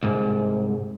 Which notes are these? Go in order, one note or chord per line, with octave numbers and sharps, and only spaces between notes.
C2 G#2